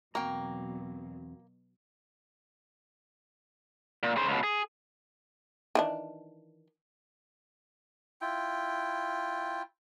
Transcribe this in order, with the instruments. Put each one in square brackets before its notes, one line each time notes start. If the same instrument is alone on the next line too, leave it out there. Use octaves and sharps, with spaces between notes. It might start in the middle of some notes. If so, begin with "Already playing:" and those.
[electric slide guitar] E2 C4 A#5 [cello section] B2 F#3 [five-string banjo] A#3 [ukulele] F#4 G5
[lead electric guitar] A#2
C#3 C5
C#2 B2
G#4
[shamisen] D#3 E3 D4
[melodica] E4 F4 G5